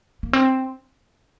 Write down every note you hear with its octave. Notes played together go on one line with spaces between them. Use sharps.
A#3
C4